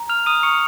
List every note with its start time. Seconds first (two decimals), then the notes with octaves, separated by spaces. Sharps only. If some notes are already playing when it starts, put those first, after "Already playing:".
Already playing: A#5
0.09 F6 F7
0.26 D#6 D#7
0.43 C#6 C#7